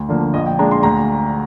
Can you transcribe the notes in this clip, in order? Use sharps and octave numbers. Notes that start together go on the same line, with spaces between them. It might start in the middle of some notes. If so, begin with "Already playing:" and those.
Already playing: D2
D3 F3 A#3 D4
A#1 D#5
G5
A#2 G#3 D4 A#5
C6
D2 A#5